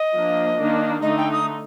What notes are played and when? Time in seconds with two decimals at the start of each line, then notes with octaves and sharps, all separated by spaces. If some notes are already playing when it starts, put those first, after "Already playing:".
Already playing: D#5
0.13 F3 A#3 D4
0.58 D#3 A#3 D4
1.02 D3 A3 D#4 D#5
1.17 G5
1.32 D#6